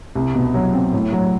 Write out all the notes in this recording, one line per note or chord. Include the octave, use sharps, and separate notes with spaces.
C2
B2
F#3
C4
A2
F#3